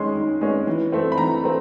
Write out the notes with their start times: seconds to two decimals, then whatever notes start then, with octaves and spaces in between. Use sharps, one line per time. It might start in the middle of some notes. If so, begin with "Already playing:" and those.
Already playing: D#3 G#3 C#4 C6
0.15 D#3
0.41 G#3 C#4
0.67 E3
0.92 A3 C4
1.12 B5
1.18 E3 A#5
1.44 A3 C4